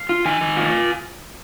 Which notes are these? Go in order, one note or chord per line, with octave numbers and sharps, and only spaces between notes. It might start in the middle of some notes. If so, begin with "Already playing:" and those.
Already playing: F5
F4
D#3 G#5
D#3
F4